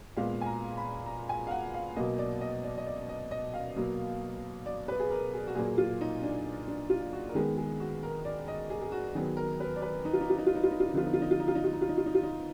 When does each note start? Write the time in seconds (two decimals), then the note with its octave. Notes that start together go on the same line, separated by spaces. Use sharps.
0.17 A#2 G#3 B3 F5
0.41 G#5
0.46 A#5
0.77 B5
1.06 A#5
1.29 G#5
1.47 F5
1.51 F#5
1.75 F5
1.96 B2 F#3 A#3 D#5
2.18 D5
2.41 D#5
2.64 D5
2.77 D#5
2.86 D5
3.09 D#5
3.31 D#5
3.54 F5
3.76 B2 F#3 A#3
4.66 D5
4.88 B4
4.99 G#4
5.10 A#4
5.34 G#4
5.47 F#4
5.55 A#2 F#3 A#3 G#4
5.78 F4
6.01 D#4
6.22 D4
6.68 D4
6.90 F4
7.13 F#4
7.29 A#4
7.35 D#3 G#3 B3 G#4
7.57 G#4
7.80 F#4
8.03 A#4
8.25 D5
8.48 D#5
8.70 G#4
8.81 G#4
8.92 F#4
9.14 D#3 F#3 B3 G#4
9.37 A#4
9.60 B4
9.76 D5
9.82 B4
10.05 D#4
10.13 F4
10.21 D#4
10.30 F4
10.38 D#4
10.46 F4
10.55 D#4
10.63 F4
10.72 D#4
10.80 F4
10.89 D#4
10.94 D3 F3 B3 F4
11.06 D#4
11.14 F4
11.22 D#4
11.31 F4
11.40 D#4
11.48 F4
11.55 D#4
11.64 F4
11.73 D#4
11.81 F4
11.89 D#4
11.98 F4
12.06 D#4
12.15 F4
12.23 D#4